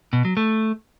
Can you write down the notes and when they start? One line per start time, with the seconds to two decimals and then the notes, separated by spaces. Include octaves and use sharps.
0.13 B2
0.25 F#3
0.37 A3